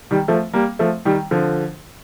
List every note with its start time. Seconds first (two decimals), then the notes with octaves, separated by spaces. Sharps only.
0.11 D#3 G3
0.28 F3 A3
0.54 G3 A#3
0.79 F3 A3
1.05 D#3 G3
1.31 D3 F3